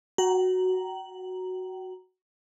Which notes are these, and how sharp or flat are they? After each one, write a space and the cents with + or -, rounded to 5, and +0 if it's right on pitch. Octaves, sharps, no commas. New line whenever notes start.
F#4 +0 G5 -40 A#5 +0